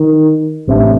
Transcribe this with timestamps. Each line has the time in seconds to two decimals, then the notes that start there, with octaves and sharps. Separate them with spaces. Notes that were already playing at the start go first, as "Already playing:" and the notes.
Already playing: D#3
0.67 A1 A2 C3 A3 D4